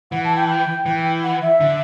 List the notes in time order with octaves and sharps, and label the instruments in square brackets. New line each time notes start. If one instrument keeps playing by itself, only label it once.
[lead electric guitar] E3 [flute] F#5
[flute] A5
G5
G5
[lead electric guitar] E3 [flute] G5
[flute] F#5
E5
[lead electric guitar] D3